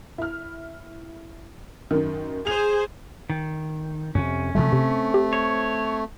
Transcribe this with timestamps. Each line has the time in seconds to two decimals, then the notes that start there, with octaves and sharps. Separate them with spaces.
0.18 E4 F6
1.91 F#2 D#3
2.47 G#4 C5 F7
3.30 D#3
4.15 F2 C3 C#4
4.55 C3 F3 F#3 A3
4.73 C3 C4
5.14 G4
5.33 C#5